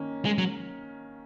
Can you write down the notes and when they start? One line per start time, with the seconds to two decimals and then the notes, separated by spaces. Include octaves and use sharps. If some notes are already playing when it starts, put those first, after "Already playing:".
Already playing: D#3 A#3 C#4
0.25 G#3
0.38 F#3